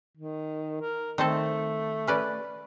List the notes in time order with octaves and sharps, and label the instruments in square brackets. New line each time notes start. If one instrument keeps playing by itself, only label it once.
[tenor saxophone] D#3
A#4
[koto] D#3 C4 A4 [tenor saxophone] A3
[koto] C#4 B4 D5